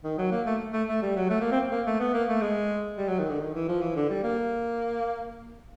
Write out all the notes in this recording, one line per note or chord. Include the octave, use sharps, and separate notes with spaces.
D#3
F#3
A#3
A3
A3
A3
G3
F#3
A3
A#3
C4
A#3
A3
B3
A#3
A3
G#3
G3
F#3
D#3
D3
D#3
E3
F3
E3
D3
G3
A#3